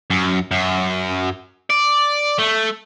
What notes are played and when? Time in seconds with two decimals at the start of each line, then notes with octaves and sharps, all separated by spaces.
0.10 F#2
0.51 F#2
1.70 D5
2.39 A3